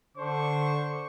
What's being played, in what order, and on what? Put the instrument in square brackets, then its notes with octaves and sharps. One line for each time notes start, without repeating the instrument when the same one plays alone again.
[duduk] D3 [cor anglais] D4 [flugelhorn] C5 [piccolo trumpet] C#6